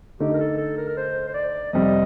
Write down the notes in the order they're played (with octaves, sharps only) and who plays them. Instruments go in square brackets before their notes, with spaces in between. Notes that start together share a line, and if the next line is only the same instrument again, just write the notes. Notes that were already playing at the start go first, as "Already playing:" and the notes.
[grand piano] D3 A3 D#4 [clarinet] G4
[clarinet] A#4
A4
A4
A#4
A#4
C5
C5
D5
[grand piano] F2 C3 G3 C4 [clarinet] D#5